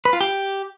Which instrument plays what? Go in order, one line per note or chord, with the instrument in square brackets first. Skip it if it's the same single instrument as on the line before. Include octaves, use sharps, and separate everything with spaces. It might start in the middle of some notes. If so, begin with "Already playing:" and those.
[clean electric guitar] B4
F4
G4